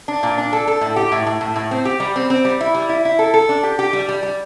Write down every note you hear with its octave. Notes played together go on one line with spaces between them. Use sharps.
D4
A#2
D4
A4
A4
A2
G4
A2
A2
A2
A2
C4
G4
G3
C4
C4
G3
E4
G3
E4
E4
A4
A4
D4
G4
G4
G3
G3
G3